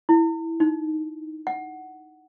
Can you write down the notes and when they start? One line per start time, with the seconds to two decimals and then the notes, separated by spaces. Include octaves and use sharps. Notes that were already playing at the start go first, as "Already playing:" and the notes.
0.09 E4
0.60 D#4
1.47 F#5